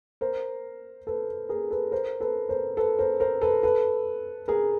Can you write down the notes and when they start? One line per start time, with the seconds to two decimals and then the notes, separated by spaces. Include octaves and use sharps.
0.21 A#4 C5
1.07 A4 B4
1.49 G#4 A#4
1.70 A4 B4
1.92 A#4 C5
2.20 A4 B4
2.49 A#4 C5
2.77 A4 B4
2.99 A#4 C5
3.20 A#4 C5
3.41 A4 B4
3.63 A4 B4
4.48 G#4 A#4